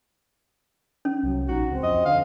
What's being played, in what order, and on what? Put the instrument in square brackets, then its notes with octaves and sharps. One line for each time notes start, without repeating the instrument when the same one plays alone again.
[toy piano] C#4
[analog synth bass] C2 [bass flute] F#3
[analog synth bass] A#1 [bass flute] D#4 [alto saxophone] F#4
[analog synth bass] C#2 [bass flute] C4
[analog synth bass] F2 [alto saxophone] D#5
[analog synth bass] D3 [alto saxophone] F5